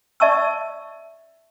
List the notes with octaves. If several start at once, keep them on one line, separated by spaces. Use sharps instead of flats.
D5 E5 A5 C#6 E6